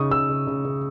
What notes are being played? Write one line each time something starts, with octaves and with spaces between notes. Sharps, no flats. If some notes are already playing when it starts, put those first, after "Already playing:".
Already playing: C#3 D#4 C#6 D#6
C#3 E6
C#3
C#3
C#3